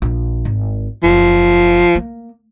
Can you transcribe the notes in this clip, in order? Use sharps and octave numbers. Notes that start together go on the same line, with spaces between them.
A#1
G#1
F#1 F3
A#3